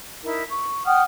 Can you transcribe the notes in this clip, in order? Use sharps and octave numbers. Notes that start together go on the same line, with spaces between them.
D#4 E4 A#4
C#6
F#5 G5 D#6 F6